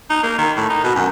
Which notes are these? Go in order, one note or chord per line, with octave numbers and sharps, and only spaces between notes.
D#4
A#3
D#3
A2
D#4
B2
F#2